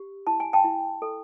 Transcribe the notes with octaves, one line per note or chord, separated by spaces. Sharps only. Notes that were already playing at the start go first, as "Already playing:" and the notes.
Already playing: G4
E4 A5
G#5
G5 A5
E4
A4